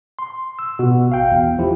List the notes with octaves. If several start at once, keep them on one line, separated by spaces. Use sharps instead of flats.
C6
E6
B2 F#4
A1 F5 G5
E2
F3 E4 G4